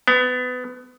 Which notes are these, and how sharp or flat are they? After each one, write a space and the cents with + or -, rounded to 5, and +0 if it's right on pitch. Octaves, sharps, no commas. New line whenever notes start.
B3 +25